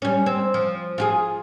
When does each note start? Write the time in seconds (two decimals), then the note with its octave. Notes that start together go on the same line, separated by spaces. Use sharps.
0.02 G3 C#4
0.26 C4
0.54 F3
0.98 F4 G4 G#4